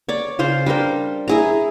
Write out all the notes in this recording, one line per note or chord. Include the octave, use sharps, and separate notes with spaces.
C#5 D5
C#3 F4 C5 F5
G3 D4 A#4 C5
E4 G#4 A#5